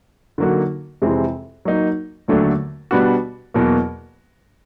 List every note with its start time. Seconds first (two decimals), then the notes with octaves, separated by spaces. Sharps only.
0.38 D3 F#3 A#3 D#4 F#4
1.02 F2 C3 E3 G#3 C4
1.65 F#3 A#3 D#4
2.28 D#2 D3 F#3 A3 D4
2.91 B2 G3 B3 D4 F#4
3.54 E2 B2 F#3 A#3